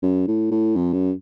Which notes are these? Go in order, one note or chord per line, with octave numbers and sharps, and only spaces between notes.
F#2
A2
A2
F2
F#2